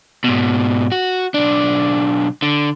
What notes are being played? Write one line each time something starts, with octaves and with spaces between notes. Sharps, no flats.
G#2 B2
F#4
B1 D4
D3